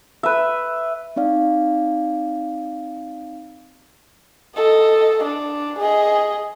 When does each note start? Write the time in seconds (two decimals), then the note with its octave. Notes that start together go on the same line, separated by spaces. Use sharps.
0.23 B4 E5
1.16 C4 D#4 D5 F5
4.56 A4 D#5
5.24 D4
5.79 G#4 D#5